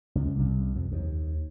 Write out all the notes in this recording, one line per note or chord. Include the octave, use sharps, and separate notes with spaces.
C#2
C2
F2
D#2